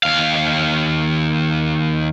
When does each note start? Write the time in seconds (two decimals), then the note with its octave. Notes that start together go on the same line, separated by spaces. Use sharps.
0.03 D#2 F5